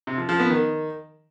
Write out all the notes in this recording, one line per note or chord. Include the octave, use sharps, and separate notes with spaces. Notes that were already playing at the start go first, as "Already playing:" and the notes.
C3
F3
F3
B3
D#3